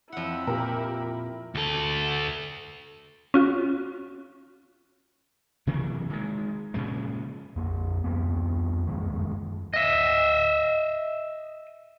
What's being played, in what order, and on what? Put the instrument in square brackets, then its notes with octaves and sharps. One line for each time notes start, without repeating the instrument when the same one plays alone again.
[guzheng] F2 F#5 [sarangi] E4
[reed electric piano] A#2 F4 [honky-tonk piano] G4 A#4
[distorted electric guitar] D2 A4
[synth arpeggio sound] C#4 F4 F#4
[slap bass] C3 E3 F#3 A#3
D#3 G#3
A#2 C#3 F3 G#3
[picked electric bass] F2 A#3
F2 F3 G3 B3
F#2 D#3 F3 G#3
[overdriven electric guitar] D#5 E5